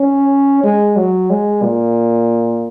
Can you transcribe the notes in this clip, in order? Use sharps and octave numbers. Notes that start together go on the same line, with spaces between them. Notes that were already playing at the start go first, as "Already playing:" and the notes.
Already playing: C#4
G#3
F#3
G#3
A#2